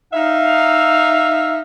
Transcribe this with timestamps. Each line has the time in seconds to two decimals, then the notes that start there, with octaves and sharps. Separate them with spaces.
0.14 D#4 E5 F5